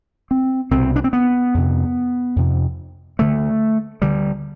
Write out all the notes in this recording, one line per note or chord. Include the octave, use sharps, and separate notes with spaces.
C4
C2 B2 C4
D4
C4
B3
F2 C3
F2 C3
D2 D3 A3
D2 D3 G3